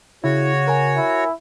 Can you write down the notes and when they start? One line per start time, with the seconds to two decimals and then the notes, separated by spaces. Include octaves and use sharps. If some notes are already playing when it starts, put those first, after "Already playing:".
0.24 C#3 E4 F#4 C#5
0.68 A#4 G#5
0.97 E4